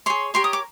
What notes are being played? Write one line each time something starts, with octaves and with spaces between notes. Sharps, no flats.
G#4 C#5 C6
G4 A#4 C#5 C6
D#6
D6